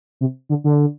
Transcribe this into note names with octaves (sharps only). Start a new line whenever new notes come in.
C3
D3
D3